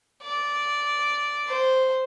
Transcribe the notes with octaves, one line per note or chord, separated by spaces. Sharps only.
D5
C5